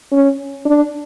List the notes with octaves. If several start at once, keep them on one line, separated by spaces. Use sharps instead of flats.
C#4
D4